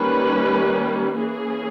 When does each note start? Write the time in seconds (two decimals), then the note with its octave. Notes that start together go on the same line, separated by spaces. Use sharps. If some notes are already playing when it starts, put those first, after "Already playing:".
Already playing: D#3 G3 A#3 C#4 B4
1.16 E3 A#3 C#4 G#4